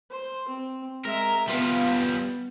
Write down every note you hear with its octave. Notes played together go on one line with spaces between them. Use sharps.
C5
C4
G#3 A#4 E5
G3 B3 F4